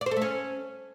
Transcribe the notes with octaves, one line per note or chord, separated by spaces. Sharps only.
D5
C5
A4
A3
C#4